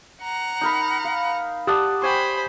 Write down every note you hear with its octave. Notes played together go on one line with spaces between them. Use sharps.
F#5 A#5
D#4 A#4 B5
F5
G4 D5 F#5 A5 D#6
C5 G5 G#5 B5 C#6